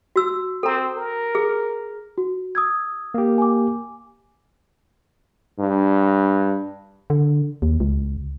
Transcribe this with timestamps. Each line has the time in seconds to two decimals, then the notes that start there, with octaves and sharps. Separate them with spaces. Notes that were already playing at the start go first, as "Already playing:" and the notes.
0.16 F#4 E6
0.63 C4 A4 A#5
0.97 A#4
1.35 G#4
2.18 F#4
2.55 D#6 E6 G#6
3.14 A#3 G4
3.38 G#5 D6
5.59 G2
7.10 D3
7.62 D#2
7.80 C#2